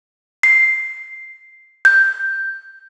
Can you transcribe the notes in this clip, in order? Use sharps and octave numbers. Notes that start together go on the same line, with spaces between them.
C7
G6